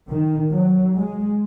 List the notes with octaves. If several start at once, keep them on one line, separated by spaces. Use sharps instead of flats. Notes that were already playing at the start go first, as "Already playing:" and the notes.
D#3
F#3
G#3